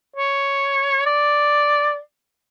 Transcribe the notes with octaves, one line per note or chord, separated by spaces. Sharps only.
C#5
D5